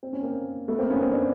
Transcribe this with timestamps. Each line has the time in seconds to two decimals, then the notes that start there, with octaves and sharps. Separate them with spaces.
0.03 C4
0.13 C#4
0.23 A#3 C4
0.68 A3 B3
0.79 A#3 C4
0.90 B3 C#4
1.00 A#3 C4
1.12 C4 D4